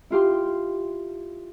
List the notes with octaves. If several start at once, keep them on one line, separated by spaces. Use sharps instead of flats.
E4 F4 G4 C6